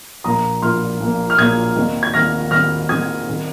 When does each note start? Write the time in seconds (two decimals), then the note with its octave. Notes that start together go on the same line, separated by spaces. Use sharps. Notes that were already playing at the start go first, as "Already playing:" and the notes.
0.24 A#1 A#2 A#3 A#5 D#6
0.62 A#1 A#2 A#3 C6 F6
1.00 A#1 A#2 A#3
1.30 F6
1.38 A#1 A#2 A#3 D#6 G#6
1.76 D#2 D#3 C4
2.03 G#6
2.14 D#2 D#3 C4 F6 A#6
2.51 D#2 D#3 C4 F6 A#6
2.89 D#2 D#3 C4 D#6 G#6
3.27 D#3 C4